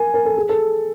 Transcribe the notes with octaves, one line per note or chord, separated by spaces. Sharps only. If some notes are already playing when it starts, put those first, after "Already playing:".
Already playing: A#4 G#5
A#4
A4
G#4
A4